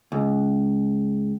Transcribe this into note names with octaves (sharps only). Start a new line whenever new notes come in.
C#2